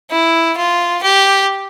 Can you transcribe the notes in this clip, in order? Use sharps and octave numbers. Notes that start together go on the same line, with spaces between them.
E4
F4
G4